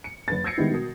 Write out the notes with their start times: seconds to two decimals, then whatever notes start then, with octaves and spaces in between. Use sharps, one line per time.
0.04 C#7
0.28 F#1 B4 A6
0.44 E6 G6 G#6 A#6 C7 C#7
0.58 D#3 G3 G#3 B3 E4
0.71 B2 A#4 D#6